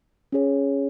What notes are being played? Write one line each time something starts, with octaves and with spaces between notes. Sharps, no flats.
C#4 G#4 C#5